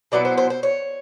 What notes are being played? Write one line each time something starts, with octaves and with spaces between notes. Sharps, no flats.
B2 F#3 B3 E4 D5
C5
C5
C5
C#5